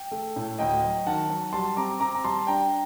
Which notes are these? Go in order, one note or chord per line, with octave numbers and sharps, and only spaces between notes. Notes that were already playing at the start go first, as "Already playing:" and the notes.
Already playing: G5
A3
A2
D2 D#5 G5
F#3
D#3 F#5 A5
F#3
G3 A5 C6
C4 A#5 D6
C4 A#5 D6
A#5
G3 A5 C6
D4 G5 A#5